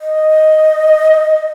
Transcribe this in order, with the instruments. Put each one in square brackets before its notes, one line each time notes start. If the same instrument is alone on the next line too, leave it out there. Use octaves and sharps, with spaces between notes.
[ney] D#5